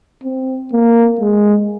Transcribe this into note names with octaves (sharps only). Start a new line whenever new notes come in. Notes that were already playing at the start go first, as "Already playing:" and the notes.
C4
A#3
G#3